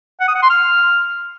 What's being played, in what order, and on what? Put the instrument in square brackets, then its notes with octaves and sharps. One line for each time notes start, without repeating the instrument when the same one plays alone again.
[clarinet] F#5
D#6
F#5
C6
F6